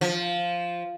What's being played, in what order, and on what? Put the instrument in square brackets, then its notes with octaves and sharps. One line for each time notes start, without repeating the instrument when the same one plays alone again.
[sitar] F3